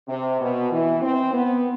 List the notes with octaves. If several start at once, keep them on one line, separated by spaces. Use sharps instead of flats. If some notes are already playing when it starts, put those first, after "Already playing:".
C3
B2
E3
C4
B3